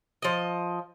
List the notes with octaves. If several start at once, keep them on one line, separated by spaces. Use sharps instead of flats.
F3 D#5